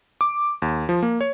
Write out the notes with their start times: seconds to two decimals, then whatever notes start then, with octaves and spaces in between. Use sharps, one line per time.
0.21 D6
0.62 D#2
0.89 F3
1.03 A#3
1.21 C#5